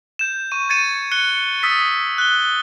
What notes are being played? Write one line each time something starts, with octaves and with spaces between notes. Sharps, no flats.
G6 E7
C#6 D#7
G#6 A6 C#7 D#7 E7
F#6 C#7 D#7 G7
D#6 E6 A6 B6
F#6 G7